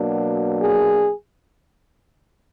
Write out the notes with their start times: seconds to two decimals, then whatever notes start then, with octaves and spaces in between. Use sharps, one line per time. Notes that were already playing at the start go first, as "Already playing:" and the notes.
Already playing: B2 F#3 A#3 D4
0.60 G#4